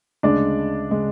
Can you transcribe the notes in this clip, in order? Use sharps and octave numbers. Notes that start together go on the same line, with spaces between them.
D2 C#3 G#3 D4 D5
C#3 G#3